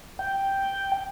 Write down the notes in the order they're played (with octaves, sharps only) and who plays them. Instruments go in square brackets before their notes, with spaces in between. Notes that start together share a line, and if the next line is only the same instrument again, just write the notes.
[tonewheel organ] G5